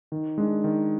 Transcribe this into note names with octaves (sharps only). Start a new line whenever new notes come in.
D#3
G#3 D4
D#3